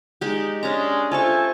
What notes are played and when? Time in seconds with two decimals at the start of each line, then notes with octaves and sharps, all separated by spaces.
0.21 G#3 D#4 G4
0.63 G#3 C#4 D4 A#5
1.11 A3 F4 A4 C5 G#5 C#6